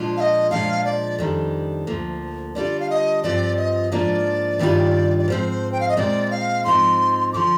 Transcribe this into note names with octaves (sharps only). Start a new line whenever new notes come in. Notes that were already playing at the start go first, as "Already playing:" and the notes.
Already playing: A#2 F3 G#3 D4 F4
F5
D#5
A#2 F3 G#3 D4 F5
D5
F2 D#3 G3 D4
D2 D3 F3 A#3
D3 G3 D4 F4 D5
F5
D#5
G2 F3 C4 F4 D5
D#5
G#2 F3 A#3 D4 F4 D5
G2 D#3 G3 D4 F4
D5
G#2 F3 C4 C5
G5
F5
D#5
A#2 G#3 C4 D5
F5
G#2 F3 C4 D#4 C6
D3 F3 C6 D6